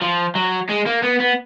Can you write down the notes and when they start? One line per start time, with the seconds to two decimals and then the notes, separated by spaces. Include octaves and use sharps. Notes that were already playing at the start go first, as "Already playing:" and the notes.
0.02 F3
0.35 F#3
0.69 G#3
0.87 A#3
1.03 B3
1.20 B3